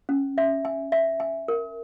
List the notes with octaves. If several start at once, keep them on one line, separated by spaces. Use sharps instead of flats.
C#4
E5
G#5
E5
G#5
A#4